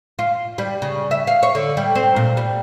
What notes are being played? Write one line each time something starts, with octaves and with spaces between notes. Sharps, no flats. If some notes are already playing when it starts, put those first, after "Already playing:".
F4
G3
C#3
E5
F5
C#5
D3
G3
C4
A#2
G3